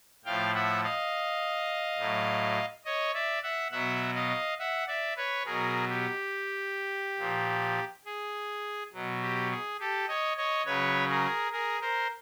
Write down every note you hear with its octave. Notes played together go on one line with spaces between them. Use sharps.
A2 F3 F5 G5
E5 F#5
D#5 F5
A2 F#3
C#5 D#5
D5 E5
E5 F#5
B2 F#3 E5 F#5
D#5 F5
E5 F#5
D5 E5
B4 C#5
B2 F#3 G#4 A#4
G4
A#2 F3
G#4
B2 F#3
G4
G#4
G4 A4
C#5 D#5
C#5 D#5
C#3 F#3 B4 C#5
G#4 A#4
G#4 A#4
A#4 C5